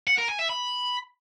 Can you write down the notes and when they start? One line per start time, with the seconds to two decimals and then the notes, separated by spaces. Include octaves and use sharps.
0.07 F#5
0.18 A#4
0.28 G#5
0.39 E5
0.49 B5